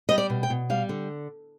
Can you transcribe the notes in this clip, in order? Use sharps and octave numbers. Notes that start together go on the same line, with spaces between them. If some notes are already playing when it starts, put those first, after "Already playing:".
G3 D#5
D5
B2
G5
B2
G3 F5
D3